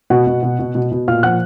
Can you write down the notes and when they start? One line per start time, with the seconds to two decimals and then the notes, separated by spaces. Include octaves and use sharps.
0.10 B2 F#4 F#5
0.27 B2
0.43 B2
0.59 B2
0.75 B2
0.92 B2
1.08 A#2 F5 F6
1.23 F3 F#5 F#6